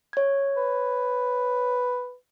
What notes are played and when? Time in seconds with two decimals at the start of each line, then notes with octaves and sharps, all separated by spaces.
0.13 C#5 G#6
0.56 B4